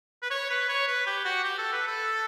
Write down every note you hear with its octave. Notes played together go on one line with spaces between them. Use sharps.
B4
C#5
B4
C#5
B4
G4
F#4
G4
A4
B4
A4